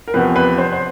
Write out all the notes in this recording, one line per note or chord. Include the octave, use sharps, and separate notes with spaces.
A#4
E2 C3 F3 B4
B4
C5
C5